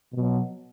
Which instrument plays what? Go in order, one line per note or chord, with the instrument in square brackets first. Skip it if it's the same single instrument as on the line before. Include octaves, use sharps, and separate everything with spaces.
[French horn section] B2 F#3